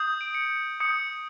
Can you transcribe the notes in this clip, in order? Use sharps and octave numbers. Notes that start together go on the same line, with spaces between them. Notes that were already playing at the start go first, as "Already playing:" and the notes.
Already playing: D#6 G6
D7
C#7
D#6 G6 C#7